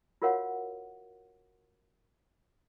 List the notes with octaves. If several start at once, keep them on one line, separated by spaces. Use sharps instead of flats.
F4 F#4 A#4 C#5 F5 F#5